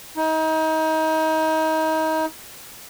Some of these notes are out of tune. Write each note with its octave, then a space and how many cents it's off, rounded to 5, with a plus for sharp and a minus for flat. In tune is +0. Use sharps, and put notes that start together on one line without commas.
D#4 +30